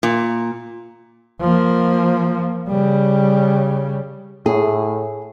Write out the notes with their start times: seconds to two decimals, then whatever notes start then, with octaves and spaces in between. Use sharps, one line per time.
0.03 A#2
1.41 F3 A#3
2.68 C#3 G3
4.46 A2 G#4